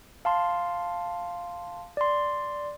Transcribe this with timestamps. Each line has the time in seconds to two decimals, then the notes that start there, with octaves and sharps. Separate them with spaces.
0.25 F5 A5 C6
1.97 D5 C6